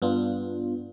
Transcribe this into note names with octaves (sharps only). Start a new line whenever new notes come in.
G2 B3 D4 F4